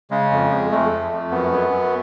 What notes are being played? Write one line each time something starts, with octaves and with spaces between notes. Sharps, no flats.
C#3 G#3
F2
F2
F2 A3
F2
F2
F#2 B3
F#2
F#2